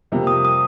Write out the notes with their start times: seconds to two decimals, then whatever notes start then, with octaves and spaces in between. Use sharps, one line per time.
0.12 F2 C3 G3 A#3
0.27 D#6
0.45 D#6